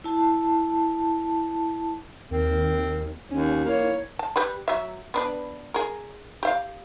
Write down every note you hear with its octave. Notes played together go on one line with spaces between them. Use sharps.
E4 A5
D#2 C4 A#4
D#2 C#4
A#3 E4 C#5
A5
G3 B4 B5
F#3 E5
B3 D4 B4
G#4 A#4
G4 E5 F5